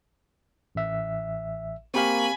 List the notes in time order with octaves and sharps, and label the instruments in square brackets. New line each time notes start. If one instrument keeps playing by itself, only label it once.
[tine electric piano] A1 E5
[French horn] A#3 [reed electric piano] C4 G4 F5 [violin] G#5 B5 [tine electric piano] C#6